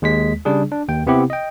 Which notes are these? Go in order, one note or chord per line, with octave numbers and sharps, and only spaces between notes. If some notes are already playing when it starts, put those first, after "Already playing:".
D#2 G#3 B6
C#3 G3 D4 G#4
D4
D#2 G5
C3 B3 C4 E4 G4
D#5 G5